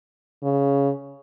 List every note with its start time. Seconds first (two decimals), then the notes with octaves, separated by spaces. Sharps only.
0.43 C#3